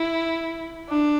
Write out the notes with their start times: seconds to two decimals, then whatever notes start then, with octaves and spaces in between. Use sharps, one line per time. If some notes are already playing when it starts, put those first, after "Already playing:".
Already playing: E4
0.89 D4